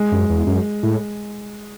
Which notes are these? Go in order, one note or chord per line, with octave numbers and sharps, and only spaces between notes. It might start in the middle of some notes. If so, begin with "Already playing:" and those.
Already playing: G#3
F#2
E2
F#2
A2